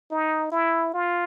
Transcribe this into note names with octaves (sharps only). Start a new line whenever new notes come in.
D#4
E4
F4